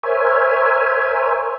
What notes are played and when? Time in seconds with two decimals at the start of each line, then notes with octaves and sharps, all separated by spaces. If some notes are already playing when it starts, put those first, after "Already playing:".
0.03 A#4 C5 C#5 E5 G#5